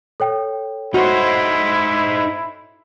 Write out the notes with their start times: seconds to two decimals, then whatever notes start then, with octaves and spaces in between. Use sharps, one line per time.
0.20 A4 C#5 G5
0.94 D#4 E4 F#4 C5